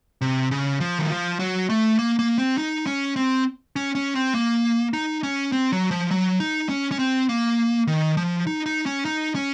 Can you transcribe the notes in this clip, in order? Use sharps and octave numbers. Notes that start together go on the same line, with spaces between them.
C3
C#3
F3
D#3
F3
F#3
A3
A#3
A#3
C4
D#4
C#4
C4
C#4
C#4
C4
A#3
D#4
C#4
C4
F#3
F3
F#3
D#4
C#4
C#4
C4
A#3
D#3
F3
D#4
D#4
C#4
D#4
C#4